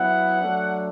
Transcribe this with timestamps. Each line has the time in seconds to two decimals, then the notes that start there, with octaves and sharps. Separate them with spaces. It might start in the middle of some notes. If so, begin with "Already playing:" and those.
Already playing: F#3 B3 E4 F#5
0.41 F#3 A3 D4